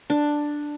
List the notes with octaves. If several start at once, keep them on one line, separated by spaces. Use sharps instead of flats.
D4